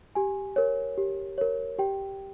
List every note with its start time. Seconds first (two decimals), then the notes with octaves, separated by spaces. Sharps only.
0.15 G4 G#5
0.56 A#4 C#5
0.98 G4
1.38 A#4 C#5
1.78 G4 G5